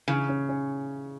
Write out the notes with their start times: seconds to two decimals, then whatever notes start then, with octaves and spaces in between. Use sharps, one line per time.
0.08 C#3 E3
0.29 C#4
0.49 C#4